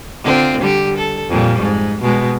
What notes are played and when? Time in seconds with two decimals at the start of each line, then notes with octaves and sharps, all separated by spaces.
0.24 D3 C4 F4
0.61 D3 G3 G4
0.97 A4
1.29 F2 A#2 G3
1.62 G#2
2.02 B2 G#3